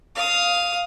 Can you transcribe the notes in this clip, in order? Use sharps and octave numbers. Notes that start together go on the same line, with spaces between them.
F5 D#6